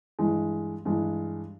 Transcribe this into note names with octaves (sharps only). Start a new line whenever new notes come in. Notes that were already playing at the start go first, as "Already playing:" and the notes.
G2 E3 G#3
G2 E3 G#3